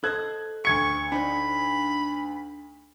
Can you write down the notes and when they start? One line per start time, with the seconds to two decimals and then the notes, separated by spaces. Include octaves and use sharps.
0.04 A4 C5 D#5 F#6 G#6
0.65 D2 C#6 G#6 C#7
1.12 D4 D#4 C5 B5